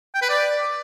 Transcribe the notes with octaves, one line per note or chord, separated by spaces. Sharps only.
G5
B4
D5